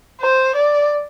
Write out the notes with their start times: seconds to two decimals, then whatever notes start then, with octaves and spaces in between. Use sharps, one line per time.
0.21 C5
0.55 D5